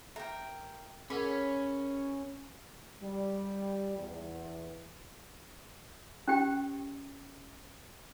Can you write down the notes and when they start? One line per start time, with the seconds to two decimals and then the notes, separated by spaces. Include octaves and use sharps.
0.16 A#4 E5 G5
1.10 C#4 G#4 A#4 F#5 B5
3.02 G3
3.98 E2
6.28 C#4 G4 G5